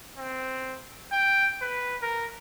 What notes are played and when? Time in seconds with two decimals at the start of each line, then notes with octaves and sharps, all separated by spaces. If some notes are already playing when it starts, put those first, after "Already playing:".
0.17 C4
1.12 G5
1.62 B4
2.02 A#4